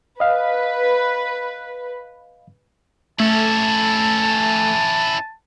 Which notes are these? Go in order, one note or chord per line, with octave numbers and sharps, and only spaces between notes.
B4 D#5 F5
A3 C#4 E4 A5